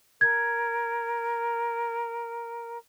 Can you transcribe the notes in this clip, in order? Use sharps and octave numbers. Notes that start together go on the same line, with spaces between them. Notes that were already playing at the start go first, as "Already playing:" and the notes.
A#4 G#6